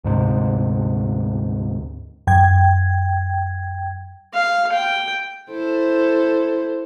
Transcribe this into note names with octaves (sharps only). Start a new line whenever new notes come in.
D2 G#2 C3
F#2 G5 G#6
F5
G5
E4 A4 C5